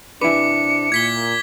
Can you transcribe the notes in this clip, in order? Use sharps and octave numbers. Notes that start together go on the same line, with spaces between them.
C3 D4 E4 B4 D6 C#7
A#2 G#6 B6 G7